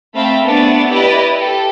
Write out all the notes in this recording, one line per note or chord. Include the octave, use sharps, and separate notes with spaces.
A3 C4 E5 F5 G5 B5
A3 B3 D4 D5
E4 G4 B4 D5 D#5
G4 A4